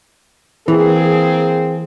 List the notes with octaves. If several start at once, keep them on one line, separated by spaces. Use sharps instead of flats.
E3 A#3 C4 G#4